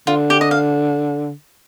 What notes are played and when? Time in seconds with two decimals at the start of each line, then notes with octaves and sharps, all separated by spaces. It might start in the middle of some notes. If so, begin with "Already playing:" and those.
0.07 D3 F4
0.30 G4
0.41 D#5
0.51 F5